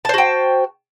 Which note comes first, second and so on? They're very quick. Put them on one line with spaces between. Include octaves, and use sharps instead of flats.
A5 C5 F#4 G5